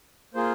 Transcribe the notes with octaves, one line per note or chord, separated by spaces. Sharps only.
A#3 F4 G#4 C5